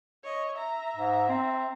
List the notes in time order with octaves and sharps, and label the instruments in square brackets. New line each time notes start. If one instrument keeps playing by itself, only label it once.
[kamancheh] C#5 D#5
E5 A#5
[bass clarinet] G#2
C4